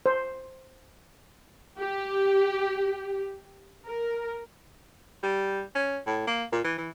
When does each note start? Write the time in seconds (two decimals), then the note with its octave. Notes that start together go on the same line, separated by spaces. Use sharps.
0.06 C5
1.79 G4
3.86 A#4
5.23 G3
5.75 C#4
6.07 A2
6.27 A#3
6.52 A#2
6.64 E3
6.78 E3